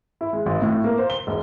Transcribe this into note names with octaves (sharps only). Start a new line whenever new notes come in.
E4
G#3
G#1
A2
A#3
C5
G7
E1